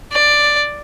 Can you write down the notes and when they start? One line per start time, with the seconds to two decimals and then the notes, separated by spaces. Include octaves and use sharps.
0.12 D5